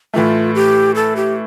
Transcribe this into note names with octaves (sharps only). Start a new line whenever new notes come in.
A2 E3 A3 F4
G4
A4
G4